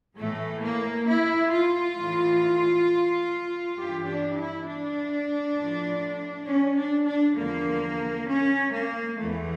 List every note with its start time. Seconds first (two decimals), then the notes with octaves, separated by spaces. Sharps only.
0.16 A2 E3 A3
0.61 A#3
1.07 E4
1.52 F4
1.97 A2 E3
3.76 G2 E3 G4
4.07 D4
4.36 E4
4.66 D4
5.57 A2 F3
6.47 C#4
6.77 D4
7.07 D4
7.36 E2 D3 F3 A#3
8.27 C#4
8.71 A#3
9.18 E2 E3 A3